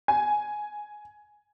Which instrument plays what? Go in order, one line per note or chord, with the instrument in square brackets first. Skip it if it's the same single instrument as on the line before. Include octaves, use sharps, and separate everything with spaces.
[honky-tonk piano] G#5